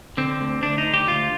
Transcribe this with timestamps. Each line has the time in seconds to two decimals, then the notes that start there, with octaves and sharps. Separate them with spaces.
0.17 D3 C4
0.41 D2
0.63 D2 D4
0.78 D#4
0.86 D3
0.94 G4
1.08 D2 F4